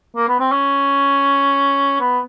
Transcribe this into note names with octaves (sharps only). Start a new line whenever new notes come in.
A#3
B3
C4
C#4
B3